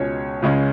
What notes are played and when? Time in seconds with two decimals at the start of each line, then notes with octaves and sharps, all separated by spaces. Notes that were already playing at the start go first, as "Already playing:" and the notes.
Already playing: C#2 B2 G#3 C#4 C#5
0.42 C#2 C#3 G#3 C#4